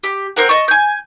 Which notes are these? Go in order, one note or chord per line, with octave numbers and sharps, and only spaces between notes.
G4
C4 A#4 F#5
D#5 A5 C#6
G#5 G6